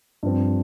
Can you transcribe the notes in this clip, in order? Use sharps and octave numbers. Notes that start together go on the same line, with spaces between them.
G2 F3 C4